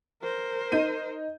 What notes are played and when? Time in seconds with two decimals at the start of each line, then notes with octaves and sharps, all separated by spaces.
0.22 A#4 C5
0.72 D#4 G6 D#7